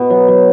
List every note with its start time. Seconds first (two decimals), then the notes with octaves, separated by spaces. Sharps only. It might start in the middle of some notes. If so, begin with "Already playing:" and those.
Already playing: B2 B3
0.10 F#3
0.28 F#3